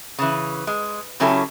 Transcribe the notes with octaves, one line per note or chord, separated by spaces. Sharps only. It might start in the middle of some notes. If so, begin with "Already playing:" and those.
C#3 E3
G#3
C#3 F#3 C#4 E4 G4 A4